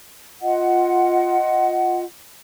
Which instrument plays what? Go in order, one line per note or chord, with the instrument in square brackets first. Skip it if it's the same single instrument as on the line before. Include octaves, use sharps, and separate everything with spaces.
[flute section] F4 D#5 F#5